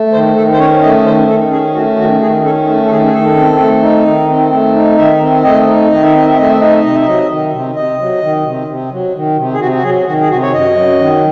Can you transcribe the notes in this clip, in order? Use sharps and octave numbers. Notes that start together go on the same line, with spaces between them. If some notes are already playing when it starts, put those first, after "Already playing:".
Already playing: A3
D#3 C5
D#3 A4
C5
C#4 C#5
A3 D#5
D#3 C5
D#3 A4
C#4 G#4
A3 F#4
D#3 F#4
D#3 G#4
C#4 A4
A3
A4
D#3 G#4
G#4
D#3 A4
C4
A3
D#4
D#3
C4
A3
D#4
D#3 E5
C4
A3 D#5
D#4
D#3 D#5
E5
C4 D#5
E5
A3 D#5
E5
D#4 D#5
E5
C3 D#5
E5
F#3 D#5
D#3
C3
C3 D#5
F#3
D#3
C3
C3
F#3
D#3
C3
G#4
C3 F#4
F#4
F#3 G#4
D#3 F#4
G#4
C3 F#4
C#5
F#2 D#5
F#3
D#3